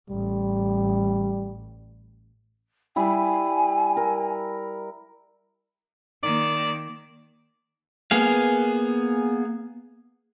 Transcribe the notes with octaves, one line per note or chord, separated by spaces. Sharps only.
A1 G3
G3 E4 G#5
A#4
D#3 A#3 D5
A#3 B3 G#4 F5